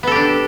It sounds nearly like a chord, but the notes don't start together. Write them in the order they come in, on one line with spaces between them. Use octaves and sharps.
B3 A4 G4 D4